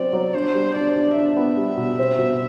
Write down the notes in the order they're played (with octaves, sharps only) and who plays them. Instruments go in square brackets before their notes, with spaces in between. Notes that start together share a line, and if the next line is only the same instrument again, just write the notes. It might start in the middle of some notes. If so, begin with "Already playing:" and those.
Already playing: [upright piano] F#3 C4 [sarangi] D5
[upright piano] F#3
[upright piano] D4 [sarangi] C5
[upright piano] G3
[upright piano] D4 [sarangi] D5
[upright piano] D4
[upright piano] D4 [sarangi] E5
[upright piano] B3
G3
B2
C4
B2